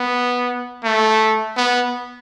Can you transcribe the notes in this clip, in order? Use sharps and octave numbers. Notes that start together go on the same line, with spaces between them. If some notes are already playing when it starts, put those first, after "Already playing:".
Already playing: B3
A3
B3